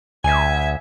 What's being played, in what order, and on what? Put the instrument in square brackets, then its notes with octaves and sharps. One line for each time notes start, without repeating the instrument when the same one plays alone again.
[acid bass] D2 [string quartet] E5 G#6 [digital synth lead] G#5